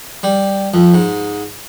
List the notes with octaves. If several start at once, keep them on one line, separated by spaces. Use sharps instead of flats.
G3
F2
G#2